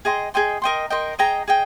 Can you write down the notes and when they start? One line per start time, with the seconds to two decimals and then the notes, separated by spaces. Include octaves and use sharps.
0.05 G#4 D#5 G5 C6
0.34 G#4 D#5 G5 C6
0.62 A#4 D#5 G5 C6
0.90 A#4 D#5 G5 C6
1.19 G#4 D#5 G5 A#5
1.48 G#4 D#5 G5